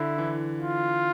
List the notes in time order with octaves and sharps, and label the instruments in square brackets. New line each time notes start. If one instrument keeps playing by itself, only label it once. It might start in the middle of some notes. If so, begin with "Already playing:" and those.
Already playing: [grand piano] D3 [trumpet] E4
[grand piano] E3
[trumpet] F4